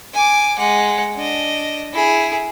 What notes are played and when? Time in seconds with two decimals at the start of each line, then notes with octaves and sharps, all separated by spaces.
0.14 G#5 D6
0.58 G#3 F#5
1.16 D4 D#5
1.93 E4 G#4